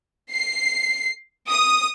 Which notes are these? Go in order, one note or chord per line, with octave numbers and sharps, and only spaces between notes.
C7
D#6